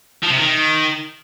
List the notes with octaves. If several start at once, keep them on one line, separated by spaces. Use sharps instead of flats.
F3
C3
D#3